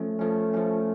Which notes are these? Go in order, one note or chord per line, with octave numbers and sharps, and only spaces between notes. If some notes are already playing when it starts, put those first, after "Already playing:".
Already playing: F3 A3 C#4
F3 A3 C#4
F3 A3 C#4